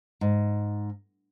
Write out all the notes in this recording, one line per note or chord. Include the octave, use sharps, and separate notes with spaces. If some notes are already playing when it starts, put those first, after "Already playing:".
G#2